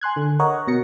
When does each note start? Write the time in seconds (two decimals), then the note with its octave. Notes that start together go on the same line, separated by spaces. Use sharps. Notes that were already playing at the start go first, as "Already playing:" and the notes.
0.01 G#5 C6 F#6 G#6
0.16 D3
0.39 A#4 C#5 D#5 F#5 C#6
0.67 B2 A#6 C#7